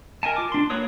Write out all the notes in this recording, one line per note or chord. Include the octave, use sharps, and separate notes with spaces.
A#4 D#5 G#5 A5
F4 D6
D4 C6
A#3 F#4 B4 C#5 D#6